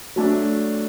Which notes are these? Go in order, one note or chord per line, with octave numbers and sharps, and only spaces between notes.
F#3 A3 D4